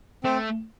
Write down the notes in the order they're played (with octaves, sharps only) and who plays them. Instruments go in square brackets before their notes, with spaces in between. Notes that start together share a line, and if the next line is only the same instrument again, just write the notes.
[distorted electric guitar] A3 [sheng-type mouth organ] C4